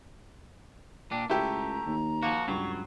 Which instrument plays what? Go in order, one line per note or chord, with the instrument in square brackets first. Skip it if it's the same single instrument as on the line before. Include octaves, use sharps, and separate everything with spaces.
[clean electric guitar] A#2 D4 [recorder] G5
[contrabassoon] C#2 [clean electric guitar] A3 [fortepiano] E4 G4 [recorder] A#5
[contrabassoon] D#2
[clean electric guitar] F3 F#4 [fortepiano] A#3
[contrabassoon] C#2 [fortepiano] G2 [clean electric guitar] F#3 [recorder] C#6